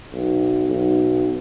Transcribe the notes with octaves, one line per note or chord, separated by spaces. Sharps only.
B1
B1